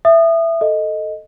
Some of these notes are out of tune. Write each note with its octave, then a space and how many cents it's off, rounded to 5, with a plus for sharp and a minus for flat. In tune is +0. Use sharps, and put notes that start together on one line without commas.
E5 +10 D#6 -25
A4 +0 D#5 +0